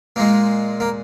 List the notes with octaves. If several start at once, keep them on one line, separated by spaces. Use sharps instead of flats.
A#2 G#3 A#3
A#3